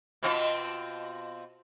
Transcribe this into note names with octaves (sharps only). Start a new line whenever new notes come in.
B2 C4 F4